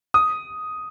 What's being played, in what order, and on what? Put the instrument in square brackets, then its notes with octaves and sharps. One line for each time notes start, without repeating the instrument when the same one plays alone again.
[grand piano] D#6